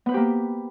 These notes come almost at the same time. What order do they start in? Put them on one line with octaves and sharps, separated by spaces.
B3 B4 C5 G4 A#3